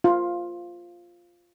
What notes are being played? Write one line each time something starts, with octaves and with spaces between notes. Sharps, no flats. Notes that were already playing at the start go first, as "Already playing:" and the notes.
F4